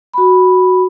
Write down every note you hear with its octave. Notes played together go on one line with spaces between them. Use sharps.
F#4 B5